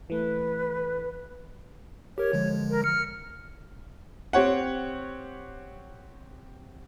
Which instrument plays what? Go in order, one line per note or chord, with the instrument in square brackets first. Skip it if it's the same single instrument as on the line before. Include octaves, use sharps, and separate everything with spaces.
[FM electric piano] E3 A3 [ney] B4
[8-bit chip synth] G4 A#4 [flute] C#5
[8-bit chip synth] D3 F3 G#3
[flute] A#4
[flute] F6 [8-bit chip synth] C#7
[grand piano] C4 G4 C#5 F#5